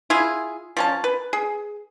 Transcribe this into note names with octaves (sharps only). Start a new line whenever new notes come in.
E4 F4 G#4
F3 C#4 A5
B4
G#4